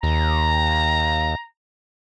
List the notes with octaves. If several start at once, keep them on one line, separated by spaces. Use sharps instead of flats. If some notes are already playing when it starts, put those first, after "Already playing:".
D#2 A#5